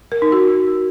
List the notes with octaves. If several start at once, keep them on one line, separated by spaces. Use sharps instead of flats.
A#4
D#4
F#4